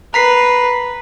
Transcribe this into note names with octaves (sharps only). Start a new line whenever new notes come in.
B4 A#5 B6 C7